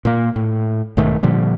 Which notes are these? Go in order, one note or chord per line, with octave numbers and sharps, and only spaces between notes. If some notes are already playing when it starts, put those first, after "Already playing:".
A#2 A#3
A2
B1 G#2 D#3 A3
A#2 D3 F3 G3